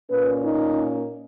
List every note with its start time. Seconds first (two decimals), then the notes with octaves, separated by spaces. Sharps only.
0.10 A#2 A#3 C#4 B4
0.43 D#4